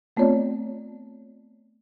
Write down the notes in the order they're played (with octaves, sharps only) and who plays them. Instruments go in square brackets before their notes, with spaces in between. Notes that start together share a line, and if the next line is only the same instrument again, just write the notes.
[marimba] A3 B3 C4 F4 C#5 D5